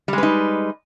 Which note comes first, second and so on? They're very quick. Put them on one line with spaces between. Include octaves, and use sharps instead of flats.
G3 G#3 B4 D#4